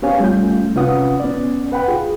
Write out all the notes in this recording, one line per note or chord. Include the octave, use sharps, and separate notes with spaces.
B3 C#4 G4 C#5 F5 G#5
G3 A3 C#4 F4 G6
C3 C#4 F4 B4 F#5 D#6
B3 C#4 D5
B4 F#5 G5 B5
F4 G#4